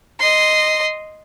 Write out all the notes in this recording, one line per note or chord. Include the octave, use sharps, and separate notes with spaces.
D#5 C6